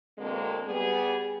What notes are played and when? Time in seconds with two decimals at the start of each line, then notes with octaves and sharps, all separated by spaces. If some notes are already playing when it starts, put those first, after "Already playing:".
0.18 B2 D3 G#3 A#3 C4
0.67 G3 B3 G#4